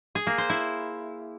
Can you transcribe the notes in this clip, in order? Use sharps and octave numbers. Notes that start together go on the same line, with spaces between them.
G#4
A#3
C5
E4